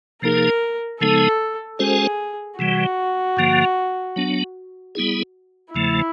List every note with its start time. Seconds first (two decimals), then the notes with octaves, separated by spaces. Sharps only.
0.22 C3 F3 A#3 D#4 G#4 A#4
1.01 C#3 F3 G#3 B3 D#4 A4
1.79 G#3 C#4 F#4 G#4 A4 C5
2.58 C3 E3 G3 F#4
3.37 G2 D3 F3 A#3
4.16 F#3 B3 D4
4.95 G3 B3 E4 G#4
5.74 E2 C#3 F3 A3 E4